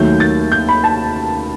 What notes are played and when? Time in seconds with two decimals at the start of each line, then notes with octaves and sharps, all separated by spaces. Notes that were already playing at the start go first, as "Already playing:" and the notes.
Already playing: D#2 D#3 F#3 A3 G6
0.20 A6
0.52 G6
0.69 B5
0.84 A5